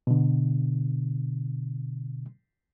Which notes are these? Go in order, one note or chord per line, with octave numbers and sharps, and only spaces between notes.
B2 D3